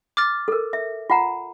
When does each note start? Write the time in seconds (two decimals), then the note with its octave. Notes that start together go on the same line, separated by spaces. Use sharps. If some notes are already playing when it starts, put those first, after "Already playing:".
0.17 D6 F6 A6
0.48 A4 A#4
0.73 E5
1.10 F4 F#5 A#5